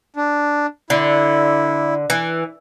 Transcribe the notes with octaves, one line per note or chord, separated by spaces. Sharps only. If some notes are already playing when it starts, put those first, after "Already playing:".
D4
D3 E4
E3